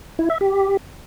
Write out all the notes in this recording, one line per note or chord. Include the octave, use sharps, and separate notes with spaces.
E4
E5
G4